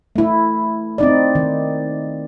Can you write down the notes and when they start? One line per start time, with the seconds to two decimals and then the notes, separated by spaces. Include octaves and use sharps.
0.16 A3 E4
0.98 C4 D#4 D5
1.35 D#3